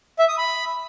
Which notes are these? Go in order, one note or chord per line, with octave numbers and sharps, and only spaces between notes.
E5
D#6
B5